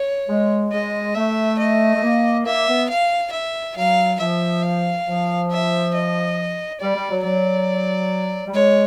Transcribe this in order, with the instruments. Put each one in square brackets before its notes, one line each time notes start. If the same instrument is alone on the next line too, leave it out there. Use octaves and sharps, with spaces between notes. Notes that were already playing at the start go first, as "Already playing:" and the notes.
Already playing: [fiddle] C#5
[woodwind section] G#3
[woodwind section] G#3 [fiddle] D#5
[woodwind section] A3 [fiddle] E5
[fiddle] D#5
[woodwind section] A3
A#3
[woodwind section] A#3 [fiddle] E5
[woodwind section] B3
[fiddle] F5
E5
[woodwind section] F#3 [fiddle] F5
[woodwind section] F3 [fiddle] E5
[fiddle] F5
[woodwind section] F3
[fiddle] E5
D#5
[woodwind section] G3 [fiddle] D5
[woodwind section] G3
F#3
[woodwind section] F#3 [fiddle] D5
[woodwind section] G3
[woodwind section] G#3 [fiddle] C#5